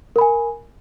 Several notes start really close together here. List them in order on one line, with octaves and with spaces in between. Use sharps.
A#4 B5 G#5